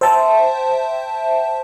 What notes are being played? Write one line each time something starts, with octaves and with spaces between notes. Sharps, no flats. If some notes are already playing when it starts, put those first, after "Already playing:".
C5 E5 G5 A5